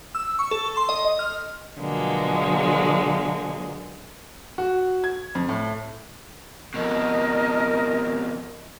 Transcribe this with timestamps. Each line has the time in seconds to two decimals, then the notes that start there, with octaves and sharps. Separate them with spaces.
0.15 E6
0.39 C#6
0.51 A4
0.77 C6
0.89 D#5
1.05 D#5
1.19 F6
1.79 B2 D3 F3 F#3 G#3 A#3
4.58 F#4
5.04 G#6
5.35 F2
5.49 A2
6.74 F2 B2 A#4 D#5